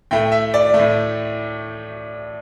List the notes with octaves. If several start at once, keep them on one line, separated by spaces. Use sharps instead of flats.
A2 A3 G5
E5
D5
A3
A2